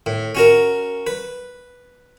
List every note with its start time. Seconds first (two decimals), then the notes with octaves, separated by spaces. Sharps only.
0.06 A2
0.35 C#4 F#4 A#4
1.07 B4